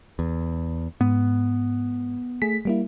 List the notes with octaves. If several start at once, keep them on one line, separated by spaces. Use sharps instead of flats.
E2
G#2 B3
A3 G#4 B6
G3 A#3 E4